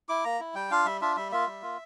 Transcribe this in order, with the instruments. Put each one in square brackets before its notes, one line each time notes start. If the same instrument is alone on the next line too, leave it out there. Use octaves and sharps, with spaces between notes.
[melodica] E4 D6
A#3 A#5
E4
G3 G5
D4 F4 F5
G3 E5
D4 F4 E5
G3 E5
A#3 F4 E5
G3
A#3 F4